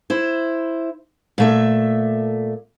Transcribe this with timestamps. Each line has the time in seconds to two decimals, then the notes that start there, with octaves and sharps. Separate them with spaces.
0.10 E4 C5
1.38 A#2 A3 E5